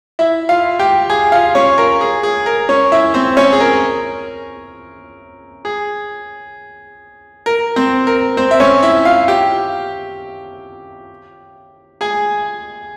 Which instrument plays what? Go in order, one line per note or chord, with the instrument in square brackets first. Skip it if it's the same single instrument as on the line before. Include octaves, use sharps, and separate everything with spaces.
[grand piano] E4 E5
F4 F5
G4 G5
G#4 G#5
F4 F5
C#4 C#5
A#4
G#4
G#4
A#4
C#4 C#5
E4 E5
C4 C5
C#4 C#5
G#4
A#4
G#4
A#4
C4 C5
A#4
C4 C5
E5
C#4 C#5
E4 E5
F4 F5
G4 G5
G#4 G#5